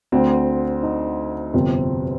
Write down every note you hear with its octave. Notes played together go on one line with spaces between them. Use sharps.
D2 D3 C4
D#4
G1 F2 C3 C4